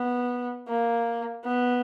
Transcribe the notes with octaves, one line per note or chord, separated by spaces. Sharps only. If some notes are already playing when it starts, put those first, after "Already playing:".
Already playing: B3
A#3
B3